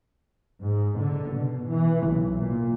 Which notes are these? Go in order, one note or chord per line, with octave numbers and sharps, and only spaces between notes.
G#2
D3
B2
E3
B1
A#2